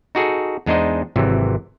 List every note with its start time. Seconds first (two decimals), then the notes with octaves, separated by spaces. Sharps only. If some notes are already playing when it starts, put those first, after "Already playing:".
0.15 D#4 F#4 G#4 A4
0.66 E2 G#3 D4 D#4 C5 D#5
1.16 G#1 C3 E3 F#3